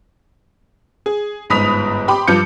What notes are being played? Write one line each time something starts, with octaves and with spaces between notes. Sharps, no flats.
G#4
G1 G#2 B5 D#6 B6 F7
G4 B5 C6 D6
G2 F3 F4 D6 G6 C#7